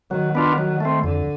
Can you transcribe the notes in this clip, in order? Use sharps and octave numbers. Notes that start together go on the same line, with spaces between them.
D#3 F#3
B3 D4 F4
F#3
A3 C4
F2 D3